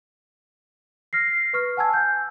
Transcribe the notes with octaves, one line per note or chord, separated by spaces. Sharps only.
F6 A#6 C7
C7
B4 C#6 F6
F#5 G#5 A5 E6 G#6
G#5 G6